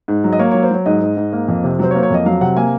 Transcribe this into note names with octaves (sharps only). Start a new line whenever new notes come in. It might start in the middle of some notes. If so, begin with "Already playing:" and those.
G#2
F#3
D#5
A#3 C#5
F#3 C#5
C5
F#3 C#5
G#2 D#5
G#2
G#2
A#3
F2
C3
F#3 C5
C#5
A#3 C5
C#5
F2 D#5
F#3 F5
C3 F#5
A#3 G#5